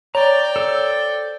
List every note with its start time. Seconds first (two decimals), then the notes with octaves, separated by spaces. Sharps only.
0.15 C#5 D5 G5 A#5
0.56 A4 C5 E6